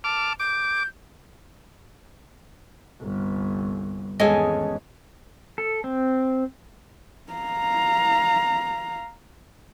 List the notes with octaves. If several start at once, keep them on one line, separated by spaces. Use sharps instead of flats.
A5 D6 F6
D6 G6
G1 C2
G#1 E2 G#3 C#4 G#4 A4 D#5 G#5
A4
C4
F5 A#5